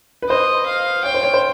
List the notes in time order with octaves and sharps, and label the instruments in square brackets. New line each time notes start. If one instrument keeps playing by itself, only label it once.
[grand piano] B4
[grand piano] C5 [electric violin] D#5
[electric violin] F5
[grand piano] C#5 [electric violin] G5
[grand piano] C5
C#5
C5